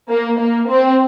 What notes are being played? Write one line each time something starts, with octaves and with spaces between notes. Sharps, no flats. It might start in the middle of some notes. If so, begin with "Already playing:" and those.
A#3
A#3
C4